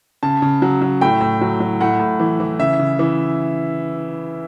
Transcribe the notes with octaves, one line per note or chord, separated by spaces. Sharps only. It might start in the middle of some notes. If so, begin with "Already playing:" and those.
C#3 A5
C#3
F#3
F#3
A2 G5
A2
F#3
F#3
A2 F#5
A2
E3
E3
C#3 E5
C#3
E3